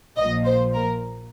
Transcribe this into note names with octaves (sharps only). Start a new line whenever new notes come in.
A#1 A#2 F3 D#5
C5
A#4